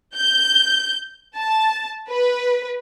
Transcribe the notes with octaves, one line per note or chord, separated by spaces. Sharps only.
G6
A5
B4